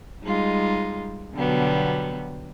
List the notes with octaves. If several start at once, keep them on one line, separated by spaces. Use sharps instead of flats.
G3 G#3 D#4 F4
B2 D3 F#3 G3 B3